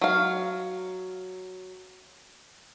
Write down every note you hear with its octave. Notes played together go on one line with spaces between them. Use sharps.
F#3 F5